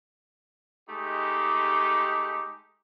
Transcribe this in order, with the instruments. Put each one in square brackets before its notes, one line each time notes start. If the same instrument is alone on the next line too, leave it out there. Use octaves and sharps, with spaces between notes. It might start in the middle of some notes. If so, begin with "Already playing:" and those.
[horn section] G#3 A3 D#4 G4